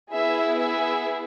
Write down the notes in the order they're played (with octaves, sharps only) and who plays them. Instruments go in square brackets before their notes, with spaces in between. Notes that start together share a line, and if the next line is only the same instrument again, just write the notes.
[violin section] B3 E4 G#4 E5
E5